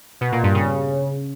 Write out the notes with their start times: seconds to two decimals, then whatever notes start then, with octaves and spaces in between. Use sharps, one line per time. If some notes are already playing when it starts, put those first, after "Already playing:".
0.21 B2
0.32 A#2
0.43 G2
0.54 C#3